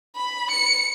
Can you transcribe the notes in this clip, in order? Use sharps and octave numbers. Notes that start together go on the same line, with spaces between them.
B5
C#7